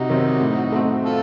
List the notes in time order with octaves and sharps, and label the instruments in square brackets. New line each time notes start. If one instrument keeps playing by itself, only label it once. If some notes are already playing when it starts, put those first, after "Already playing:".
Already playing: [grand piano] C3 [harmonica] D#4 F#4
[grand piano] D#3 F#3 C4
A2
A3 C4
[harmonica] F4 A4